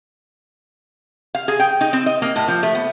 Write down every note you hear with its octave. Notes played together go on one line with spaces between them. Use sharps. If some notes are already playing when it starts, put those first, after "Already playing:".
F5
G#4
G5
D#4
C4
D#5
A#3
A2
F3
A3
B3